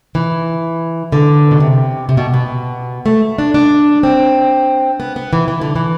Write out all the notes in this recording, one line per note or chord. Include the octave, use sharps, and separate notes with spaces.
E3
D3
B2
C3
C3
B2
B2
A3
D4
D4
C4
B3
B3
E3
E3
D3
E3